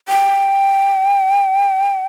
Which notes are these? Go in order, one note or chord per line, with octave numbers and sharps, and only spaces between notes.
G5